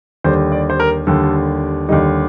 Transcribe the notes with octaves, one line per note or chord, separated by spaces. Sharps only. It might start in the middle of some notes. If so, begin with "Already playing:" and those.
D#2 D3 G3 C5
D5
C5
A#4
D#2 D3 G3 A4
D#2 D3 G3 D#4